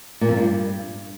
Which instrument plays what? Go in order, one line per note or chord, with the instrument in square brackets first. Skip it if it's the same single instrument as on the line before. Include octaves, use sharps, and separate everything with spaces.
[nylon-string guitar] A#2
F2
G2